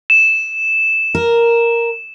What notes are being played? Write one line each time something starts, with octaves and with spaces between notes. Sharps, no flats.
E7
A#4